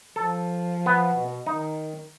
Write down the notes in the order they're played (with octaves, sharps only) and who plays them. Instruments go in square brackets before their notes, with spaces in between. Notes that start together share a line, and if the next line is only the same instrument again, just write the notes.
[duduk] F3 [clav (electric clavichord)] A4
[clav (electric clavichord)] B3
[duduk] B2
[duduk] D#3 [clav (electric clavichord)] D#4